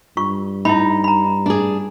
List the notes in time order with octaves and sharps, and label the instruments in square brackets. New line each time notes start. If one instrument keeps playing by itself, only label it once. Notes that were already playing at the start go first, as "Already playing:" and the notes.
[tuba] G2 [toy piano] F4 C#6
[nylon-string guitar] D#4 [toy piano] E4 B5
[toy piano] A#5 B5
[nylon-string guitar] D4 G#4